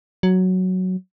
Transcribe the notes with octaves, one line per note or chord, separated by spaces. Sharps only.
F#3